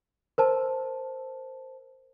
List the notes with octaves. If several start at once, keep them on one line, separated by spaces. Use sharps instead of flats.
A#4 C5 A5